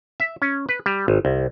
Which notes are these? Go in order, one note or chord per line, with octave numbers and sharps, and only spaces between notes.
E5
C#4
B4
G3
G#1
C2